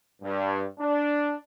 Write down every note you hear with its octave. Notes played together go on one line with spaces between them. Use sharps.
G2
D4